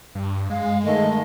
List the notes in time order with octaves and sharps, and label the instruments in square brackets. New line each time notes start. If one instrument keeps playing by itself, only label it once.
[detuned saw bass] G2
[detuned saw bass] G#3 [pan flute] F5
[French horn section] D#3 A3 [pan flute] D#5